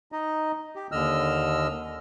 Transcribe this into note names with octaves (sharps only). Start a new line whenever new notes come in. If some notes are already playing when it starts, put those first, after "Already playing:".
D#4 D#5
G4
D#2 D3 D#5 E6 F6